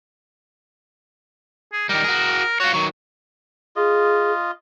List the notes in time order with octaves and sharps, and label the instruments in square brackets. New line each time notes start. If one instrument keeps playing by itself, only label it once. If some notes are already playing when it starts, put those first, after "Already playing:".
[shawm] G#4
[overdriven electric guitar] D#3 G3 [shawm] A#4
[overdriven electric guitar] F#4 G#4
[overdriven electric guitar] F4 C#5 [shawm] F#4
[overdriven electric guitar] D#3 F#3 [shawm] C#6
[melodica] F4 D#5 [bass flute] G#4